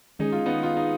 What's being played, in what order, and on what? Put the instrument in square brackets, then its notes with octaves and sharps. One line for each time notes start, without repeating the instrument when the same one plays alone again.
[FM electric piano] D#3 G#3 C#4 G#4 [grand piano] D#4
[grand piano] F4
B3 D#4
F4
D#4